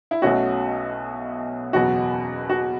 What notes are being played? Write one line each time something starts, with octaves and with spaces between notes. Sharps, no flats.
E4
B1 B2 A3 C#4 F#4
F#1 E2 B2 F#3 F#4
F#4